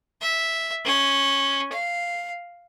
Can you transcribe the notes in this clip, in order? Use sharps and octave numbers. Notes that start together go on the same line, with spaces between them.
E5
C#4
F5